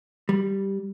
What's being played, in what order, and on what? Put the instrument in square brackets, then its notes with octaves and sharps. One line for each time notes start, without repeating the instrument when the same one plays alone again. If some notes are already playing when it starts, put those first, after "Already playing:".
[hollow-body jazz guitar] G3